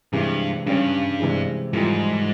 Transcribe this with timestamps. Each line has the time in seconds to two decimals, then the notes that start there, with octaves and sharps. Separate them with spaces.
0.13 G2 C3 E3 G#3
0.66 G2 C#3 G3 C#4
1.20 C3 E3 G#3
1.73 F2 G#2 E3 G3